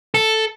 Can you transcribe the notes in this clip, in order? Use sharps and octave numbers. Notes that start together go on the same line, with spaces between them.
A4